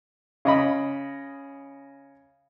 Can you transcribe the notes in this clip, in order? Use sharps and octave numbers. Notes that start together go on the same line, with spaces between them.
C#3 D#5 B5